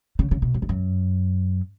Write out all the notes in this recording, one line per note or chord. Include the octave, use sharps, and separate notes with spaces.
C#3
C#3
B2
F#2
E2
F#2